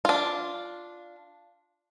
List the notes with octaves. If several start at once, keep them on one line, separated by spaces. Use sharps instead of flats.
D4 F4